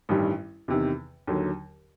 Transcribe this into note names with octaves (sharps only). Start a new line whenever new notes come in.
A1 G2 D#3 G3
E2 C3 D#3
D#2 D3 F#3